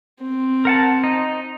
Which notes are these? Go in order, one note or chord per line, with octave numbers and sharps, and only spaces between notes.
C4
A#4 F#5 A5
D#4